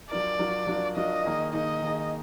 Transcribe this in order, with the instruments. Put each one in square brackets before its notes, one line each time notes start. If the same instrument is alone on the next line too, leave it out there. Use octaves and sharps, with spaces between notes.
[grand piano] F#3 D4 F4 A#4 [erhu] D5
[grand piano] F#3 D4 F4 A#4
F#3 D4 F4 A#4
[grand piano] F#3 D4 F4 A#4 [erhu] D#5
[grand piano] D#3 A#3 D#4 G#4
[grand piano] D#3 A#3 D#4 G#4 [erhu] D#5
[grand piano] D#3 A#3 D#4 G#4